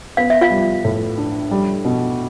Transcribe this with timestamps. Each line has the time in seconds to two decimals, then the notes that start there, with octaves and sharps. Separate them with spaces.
0.17 B3 F5
0.30 E5
0.41 F4 F5
0.51 G3
0.84 A2
1.18 D4
1.51 G3
1.85 B2